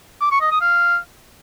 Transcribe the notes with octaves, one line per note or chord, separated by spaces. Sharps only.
D6
C#6
D#5
D#6
F5